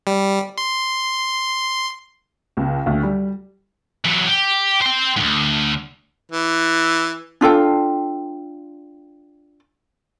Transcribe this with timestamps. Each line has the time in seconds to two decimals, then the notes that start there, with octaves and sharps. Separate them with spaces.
0.07 G3
0.58 C6
2.57 C#2
2.86 D2
3.03 G3
4.05 E3 F#3
4.27 G4
4.82 C5 G5
5.17 D2 G#2
6.32 E3
7.41 D4 F4 A4 G5